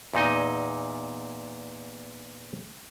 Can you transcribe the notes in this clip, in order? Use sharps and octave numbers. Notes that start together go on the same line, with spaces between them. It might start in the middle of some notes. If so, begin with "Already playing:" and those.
E2 A#2 D#4 D#5